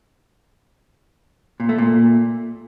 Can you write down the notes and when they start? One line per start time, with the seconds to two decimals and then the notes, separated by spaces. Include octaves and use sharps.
1.60 A#2
1.69 A3
1.78 A#2